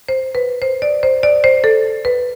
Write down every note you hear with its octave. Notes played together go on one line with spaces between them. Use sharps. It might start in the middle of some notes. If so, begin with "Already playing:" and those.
C5
B4
C5
D5
C5
D5
C5
A4
B4